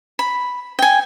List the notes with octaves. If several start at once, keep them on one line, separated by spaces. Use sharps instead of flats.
B5
G5 G#5